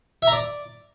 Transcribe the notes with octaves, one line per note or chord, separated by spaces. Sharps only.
E5
A#5
D5